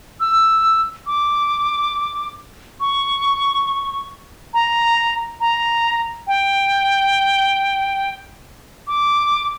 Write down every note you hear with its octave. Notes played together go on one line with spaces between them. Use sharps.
E6
D6
C#6
A#5
A#5
G5
D6